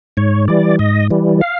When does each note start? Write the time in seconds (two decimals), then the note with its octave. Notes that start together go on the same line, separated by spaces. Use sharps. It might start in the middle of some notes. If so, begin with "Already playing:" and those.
0.17 G#2 C#5
0.48 E3 G3 D5
0.79 G#2 D#5
1.11 E3 G3
1.41 F5